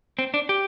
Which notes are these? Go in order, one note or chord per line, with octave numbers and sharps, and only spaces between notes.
C4
D4
G4